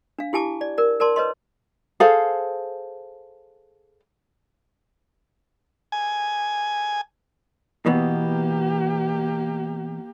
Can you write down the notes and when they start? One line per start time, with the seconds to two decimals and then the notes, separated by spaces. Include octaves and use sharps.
0.19 D4 F5
0.33 E4 G4 G#5 A5 D6
0.61 D5
0.78 A#4 D5
1.00 A#4 D5 A5 C6
1.16 B4 C#5 D#5 C6
2.00 G#4 A4 C5 F5
5.92 G#5
7.86 B2 E3 A#3 B3 G4